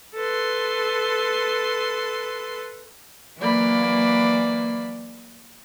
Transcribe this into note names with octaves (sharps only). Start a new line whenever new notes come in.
A4 B4 C6
E3 F#3 A#3 D5 B5